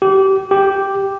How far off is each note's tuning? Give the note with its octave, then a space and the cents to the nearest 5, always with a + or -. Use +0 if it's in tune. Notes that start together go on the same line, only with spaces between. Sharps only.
G4 -25
G4 +0